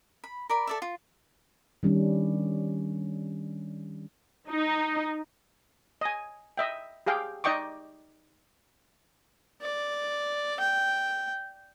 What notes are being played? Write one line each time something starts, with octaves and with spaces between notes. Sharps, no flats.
B5
A#4 D5 B5
A4 D5 E5
F4
D#3 G3 C#4 D4
D#4
D#5 G#5
D#5 E5 G5
G4 G#4 F5 G5
D#4 D5 D#5 G5 C#6 D6
D5
G5